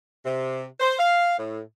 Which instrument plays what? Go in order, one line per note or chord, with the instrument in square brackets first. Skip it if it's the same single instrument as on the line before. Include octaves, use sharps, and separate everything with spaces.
[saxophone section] C3
C5
F5
A2